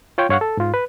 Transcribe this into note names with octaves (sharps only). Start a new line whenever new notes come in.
F4 C#5 G5
G2 C#5 F5 F#5 C#6
A4
G#2 F4
B4